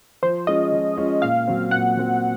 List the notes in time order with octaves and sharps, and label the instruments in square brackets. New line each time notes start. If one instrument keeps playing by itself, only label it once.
[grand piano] F3 [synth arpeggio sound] C5
[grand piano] G#3 C#4 F4 [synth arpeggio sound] D#5
[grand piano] F3
G#3 C#4 F4
[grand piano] A#2 [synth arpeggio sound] F5
[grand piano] F#3 C4
[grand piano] A#2 [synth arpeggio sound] F#5
[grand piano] F#3 C4